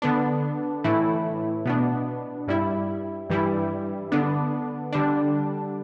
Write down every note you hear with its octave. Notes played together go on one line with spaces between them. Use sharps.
D3 B3 D4
A2 E3 A3 E4
B2 B3 D4
G2 G3 E4
G2 E3 G3 E4
D3 B3 D4
D3 G3 D4